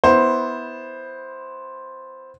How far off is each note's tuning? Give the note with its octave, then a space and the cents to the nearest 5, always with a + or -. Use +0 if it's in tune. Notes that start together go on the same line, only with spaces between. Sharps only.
B3 +0 E4 -15 C5 +5